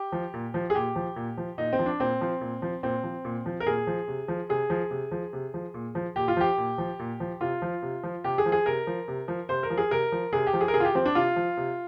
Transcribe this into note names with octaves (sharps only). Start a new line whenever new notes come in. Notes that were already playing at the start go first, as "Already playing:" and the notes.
Already playing: G4
F3
A#2
F3
G#4
A#2 G4
F3
A#2
F3
A#2 D#4
C4
F3
D4
A#2 C4
F3
A#2
F3
A#2 C4
F3
A#2
F3
A#4
A#2 G#4
F3
C3
F3
C3 G#4
F3
C3
F3
C3
F3
A#2
F3
A#2 G4
F4
F3 G4
A#2
F3
A#2
F3
C3 F4
F3
C3
F3
C3 G4
G#4
F3
G#4
C3 A#4
F3
C3
F3
C3 C5
A#4
F3
G#4
C3 A#4
F3
C3 G#4
G4
F3
G#4
A#4
C3 G#4
F4
G4
F3 C4
D4
C3 F4
F3
C3